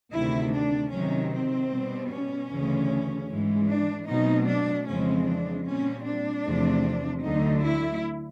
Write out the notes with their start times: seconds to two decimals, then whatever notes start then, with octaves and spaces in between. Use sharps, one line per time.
0.12 D2 C3 D#3 E4
0.53 D4
0.91 C3 D#3 F#3 C#4
1.31 C4
1.70 B2 G3 B3
2.10 C#4
2.49 D2 C#3 E3
3.28 G#2 E3 G#3
3.68 D4
4.07 B2 F#3 A3 C4 D#4
4.47 D4
4.86 F2 C#3 E3 G#3 C4 C#4
5.25 D4
5.65 A#2 G3 C4 C#4
6.05 D4
6.44 E2 C3 F3 A3 C4
7.23 D2 D3 F#3 A3 D#4
7.63 E4